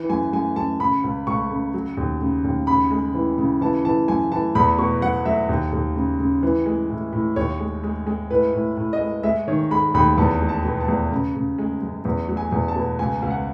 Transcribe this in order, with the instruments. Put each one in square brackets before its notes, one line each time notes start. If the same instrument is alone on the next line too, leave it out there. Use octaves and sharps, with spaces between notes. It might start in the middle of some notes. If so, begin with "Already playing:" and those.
Already playing: [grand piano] E3
F#2 G#5
F#2 G#5
F#2 A5
C#3 B5
C#2
C#2 C#6
C#3
F#3
D#2
C#3
D#2
C#3 B5
G#3
E3
C#3
E3 A5
E3 A5
F#2 G#5
E3 A5
E2 B5
B2 C#6
F#3 F#5
F#3 E5
D#2
D#2
C#3
C#3
E3
G#3
A2
A2
D#2 C#5
G#3
G#3
G#3
A2 B4
A2
A2
D#5
G#3
G#3 E5
D#3 C#5
G#3 B5
D#2 B5
E2 A5
G#3
A5
B2
A5
E2
C#3
C#3
G#3
F#2
E2
F#3
G#5
E2
A5
B2
C#2 G#5
C#2
F#5